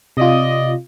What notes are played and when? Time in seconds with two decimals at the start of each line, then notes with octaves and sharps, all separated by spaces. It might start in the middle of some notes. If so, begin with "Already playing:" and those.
0.17 C3 F4 D5 D#5